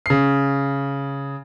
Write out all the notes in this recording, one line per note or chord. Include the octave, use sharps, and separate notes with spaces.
C#3 C7